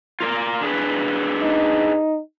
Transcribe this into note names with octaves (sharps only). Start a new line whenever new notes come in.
F4 A#4 D5
D4 G#4 B4
D#4